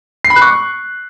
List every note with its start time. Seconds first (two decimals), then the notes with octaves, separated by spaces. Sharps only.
0.24 C7
0.30 B5
0.36 F#6
0.42 C#6